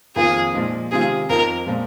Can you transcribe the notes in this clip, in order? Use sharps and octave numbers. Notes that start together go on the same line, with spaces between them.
F2 D#3 A#3 F4 G#4
A#2 F3 G#3 D#4
C3 D#3 G#3 C4 F4 G#4
F2 F3 C4 D#4 A#4
A#2 F3 G#3